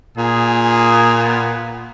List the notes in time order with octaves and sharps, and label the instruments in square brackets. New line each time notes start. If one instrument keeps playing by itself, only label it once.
[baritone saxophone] A#2 [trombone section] G#4
[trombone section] B3